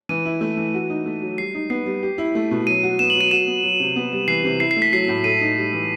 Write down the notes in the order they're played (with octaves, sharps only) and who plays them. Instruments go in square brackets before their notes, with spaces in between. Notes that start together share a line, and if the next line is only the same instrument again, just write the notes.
[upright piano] E3 [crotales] D#7
[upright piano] E4
A3
E3
F#4
D#4
A3
F#3
[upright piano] G3 [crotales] C7
[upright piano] D#4
[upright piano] B3 [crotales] C7
[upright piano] G3
G4
E4
A3
B2
[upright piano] F#3 [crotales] D#7
[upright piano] F#4
[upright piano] B3 [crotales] E7
[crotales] F#7
[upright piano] F#3
[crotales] D#7
[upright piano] F#4 [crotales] E7
[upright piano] B3
F#3
C3
B3
G3
[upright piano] E3 [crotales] C7
[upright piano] C3
[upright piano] E4 [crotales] C7
[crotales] C7
[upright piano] A3
[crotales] B6
[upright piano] F#3 [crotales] C7
[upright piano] A2
[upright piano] A4 [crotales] D#7
[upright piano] D#4
G3
E3